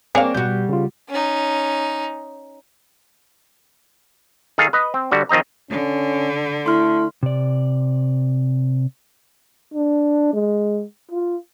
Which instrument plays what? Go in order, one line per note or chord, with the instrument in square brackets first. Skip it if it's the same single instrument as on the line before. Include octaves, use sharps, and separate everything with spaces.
[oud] A#3 D4 C#5 [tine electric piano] C4 [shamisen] G#4 F5
[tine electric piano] B2 G6 [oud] G3 F#4
[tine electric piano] C#3 F4
[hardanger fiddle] C#4 D#4
[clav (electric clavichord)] D#3 G#4 A4 F5 G#5
B4 D#5
C4
D3 G3 F#4
D#3 F3 C4 D#5 A#5
[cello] D3 [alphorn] C#4
[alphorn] A3 [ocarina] E4 [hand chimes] C6 F6
[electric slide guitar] C3 D5
[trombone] D4
G#3
F4